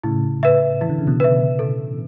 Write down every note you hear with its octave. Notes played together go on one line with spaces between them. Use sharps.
A2 C#3 E4
B4 E5
E3 E4
D3
C#3
B2 D3
B4 E5
A4